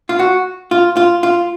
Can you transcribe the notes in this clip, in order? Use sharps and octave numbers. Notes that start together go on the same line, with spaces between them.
F4
F#4
F4
F4
F4